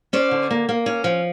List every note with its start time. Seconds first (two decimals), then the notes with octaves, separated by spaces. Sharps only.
0.13 C#4 C5 D5
0.31 D3
0.51 A#3
0.69 A#3
0.86 C#4
1.04 F3